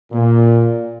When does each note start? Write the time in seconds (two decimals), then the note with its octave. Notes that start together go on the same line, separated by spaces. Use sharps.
0.12 A#2